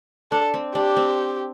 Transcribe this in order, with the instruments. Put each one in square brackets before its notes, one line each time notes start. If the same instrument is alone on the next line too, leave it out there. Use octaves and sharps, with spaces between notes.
[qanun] D4 [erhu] A4
[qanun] C4
[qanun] D4 [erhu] G4
[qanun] C4